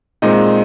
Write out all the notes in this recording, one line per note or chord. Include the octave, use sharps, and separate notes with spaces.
A#2 G#3 C4 D#4 D#5